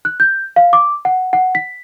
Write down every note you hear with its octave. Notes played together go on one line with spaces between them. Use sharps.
F#6
G6
F5
D6
F#5
F#5
B6